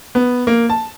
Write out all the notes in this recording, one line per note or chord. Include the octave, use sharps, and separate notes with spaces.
B3
A#3
A5